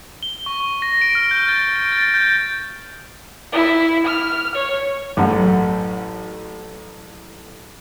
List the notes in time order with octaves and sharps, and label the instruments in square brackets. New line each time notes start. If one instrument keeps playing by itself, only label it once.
[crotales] G7
C#6
C#6
A#6
D7
F6
G6
A6
D7
A6
G6
[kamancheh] E4
F6
C#5
[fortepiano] A1 F#2 F#5